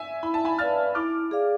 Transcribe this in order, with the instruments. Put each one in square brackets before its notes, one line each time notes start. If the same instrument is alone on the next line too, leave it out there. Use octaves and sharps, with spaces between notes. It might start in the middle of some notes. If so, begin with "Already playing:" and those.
Already playing: [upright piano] E5 G#5
[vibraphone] E4 [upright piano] B5
[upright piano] A5
G#5 B5
[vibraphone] B4 D5 F5 [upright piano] F6 A6
[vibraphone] E4 [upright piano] D6 F6
[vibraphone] G#4 D5 F5